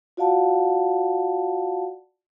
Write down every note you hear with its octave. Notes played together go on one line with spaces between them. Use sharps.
F4 F#4 D5 F5 F#5 A5